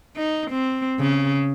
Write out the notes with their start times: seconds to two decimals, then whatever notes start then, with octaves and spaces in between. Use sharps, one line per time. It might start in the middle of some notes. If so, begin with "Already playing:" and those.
0.16 D#4
0.51 C4
1.00 C#3